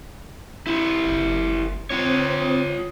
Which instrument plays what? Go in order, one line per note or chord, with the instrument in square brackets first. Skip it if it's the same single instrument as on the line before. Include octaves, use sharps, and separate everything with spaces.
[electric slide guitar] E4 G4
[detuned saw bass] F#1
[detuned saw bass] C4 [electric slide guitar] F4 C#5